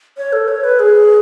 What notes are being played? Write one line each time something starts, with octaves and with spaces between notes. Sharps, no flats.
C#5
A4
C#5
B4
G#4